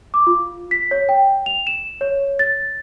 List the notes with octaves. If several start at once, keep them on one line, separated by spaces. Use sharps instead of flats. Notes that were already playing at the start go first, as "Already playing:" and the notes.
D6
F4
B6
C#5
G5
F7
E7
C#5
A6